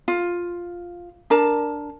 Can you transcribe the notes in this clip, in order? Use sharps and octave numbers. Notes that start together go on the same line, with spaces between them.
F4
D4 A#4 A5